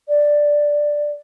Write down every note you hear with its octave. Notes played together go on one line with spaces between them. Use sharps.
D5